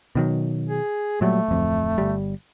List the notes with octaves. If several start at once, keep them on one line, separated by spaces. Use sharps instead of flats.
B2 D#3 F#3
G#4
A#2 F#3 G3 A3
D1 F2
G1 G3